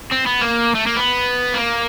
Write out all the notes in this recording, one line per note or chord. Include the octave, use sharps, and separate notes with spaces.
C4
B3
A#3
A3
A#3
B3
A#3